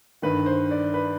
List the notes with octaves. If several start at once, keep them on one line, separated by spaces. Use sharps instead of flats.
G1 G2 D#3 B4
C5
D5
B4